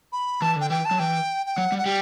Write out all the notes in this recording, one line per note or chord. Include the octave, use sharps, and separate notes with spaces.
B5
E3 A5
D3 G5
E3 G5
A5
F#3
E3 G5
G5
F#3 F#5
G3
F#5
G3 G5